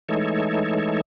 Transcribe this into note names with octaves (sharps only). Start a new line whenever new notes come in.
E3 G#3 A3 D#4 A4 C#5